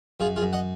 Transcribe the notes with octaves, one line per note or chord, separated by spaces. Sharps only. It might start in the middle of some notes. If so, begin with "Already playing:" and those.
F#2 F4 G#4
F4 G#4
F#2
D#5 F#5